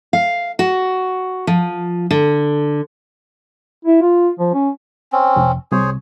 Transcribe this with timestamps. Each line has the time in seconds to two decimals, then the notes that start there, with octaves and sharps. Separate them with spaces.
0.13 F5
0.59 F#4
1.47 F3
2.11 D3
3.85 E4
4.02 F4
4.39 F3
4.54 C#4
5.12 C4 C#4
5.36 F1
5.72 C2 G#4 C5 C#5